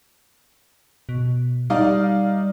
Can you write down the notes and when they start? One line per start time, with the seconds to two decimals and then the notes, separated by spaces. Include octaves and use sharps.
1.09 B2
1.70 G3 D#4 D5 F5